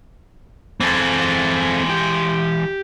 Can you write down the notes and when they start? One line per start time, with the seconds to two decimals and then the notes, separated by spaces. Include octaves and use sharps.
0.80 E3 G#3 C4 A4
1.89 G4